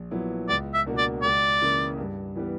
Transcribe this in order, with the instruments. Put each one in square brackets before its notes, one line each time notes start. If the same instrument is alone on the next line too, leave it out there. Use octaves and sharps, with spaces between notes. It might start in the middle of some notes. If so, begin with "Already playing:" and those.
Already playing: [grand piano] A#1
A#2 F#3 B3 E4
[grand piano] C#2 [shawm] D5
[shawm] E5
[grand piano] B2 A#3 D4 F#4
[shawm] D5
[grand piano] C#2 [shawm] D5
[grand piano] C#3 E3 A#3 E4
G2
E3 G3 B3